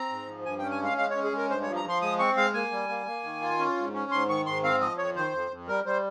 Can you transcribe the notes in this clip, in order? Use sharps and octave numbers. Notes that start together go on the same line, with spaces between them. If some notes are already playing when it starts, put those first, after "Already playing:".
Already playing: C4 A#5
G#2
F3
G2 G#5
C#4 G5
G#5
G#3 F5
G#3 F5
C#5
C#4
G#4
G#3 A#4
G2 C5
C#5
F3
A#5
F3 C6
G#3 D#6
C4 C#6
G#3 F5
A#3 G#5
G3
A#3
A#3
D#3
F4
C#4
G#2
C#4
G#2 C6
D#3 C#6
G#2 C6
C4 F5
F3 D#5
F2 C#5
D#3 C5
F2
F2
G3 A#4
G3 C5